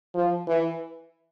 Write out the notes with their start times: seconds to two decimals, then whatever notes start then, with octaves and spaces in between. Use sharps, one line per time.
0.14 F3
0.48 E3